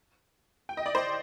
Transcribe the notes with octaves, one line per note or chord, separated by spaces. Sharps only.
G5
D#5
D5
C5